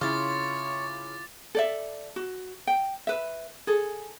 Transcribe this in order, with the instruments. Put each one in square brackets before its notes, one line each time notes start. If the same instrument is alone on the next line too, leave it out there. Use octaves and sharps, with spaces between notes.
[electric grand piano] C#3 E4 [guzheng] F4 [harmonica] C#5 [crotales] D6 A6
[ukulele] A4 D5 E5
F#4
G5
B4 E5
G#4 A4